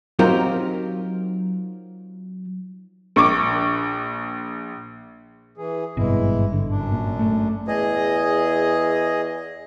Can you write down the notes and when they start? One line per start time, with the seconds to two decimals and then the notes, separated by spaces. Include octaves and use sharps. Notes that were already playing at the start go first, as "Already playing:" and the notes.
0.19 F#3 C4 D#4 F4 G4 A#4
3.16 A#1 C#6 D6
5.57 E3 G#4
5.97 G#1 G2 B2 E3 G#3 E4
6.53 D3
6.70 F#2 D4
6.92 A#2
7.19 A3
7.68 E2 G#4 D#5